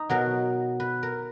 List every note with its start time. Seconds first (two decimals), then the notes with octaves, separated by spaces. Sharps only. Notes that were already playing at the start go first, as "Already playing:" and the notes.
Already playing: D#4
0.09 B2 F#3 A#4
0.80 B4
1.03 A#4